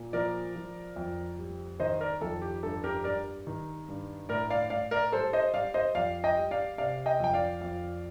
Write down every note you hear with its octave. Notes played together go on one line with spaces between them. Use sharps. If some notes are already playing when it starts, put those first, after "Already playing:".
Already playing: A#2
F3 A#4 D5
F3
F2
G3
D#3 C5 D#5
A#4 D5
F2 A4
G4
G2 A4
G4 A#4
G3 A#4 D5
D#3
G2
A2 A#4 D5
D5 F5
A2 D5 F5
A#4 D5
G3 A4 C5
C5 D#5
G3 D5 F5
C5 D#5
F2 D5 F5
D#5 G5
G3
D5 F5
C3 D5 F5
D#5 G5
F2 G5
D5 F5
F2